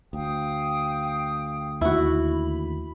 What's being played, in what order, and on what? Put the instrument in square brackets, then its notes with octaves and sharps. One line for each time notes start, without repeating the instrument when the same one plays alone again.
[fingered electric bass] D2 [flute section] F5 G5 D#6
[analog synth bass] D#2 [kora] E4 F#4 [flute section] B5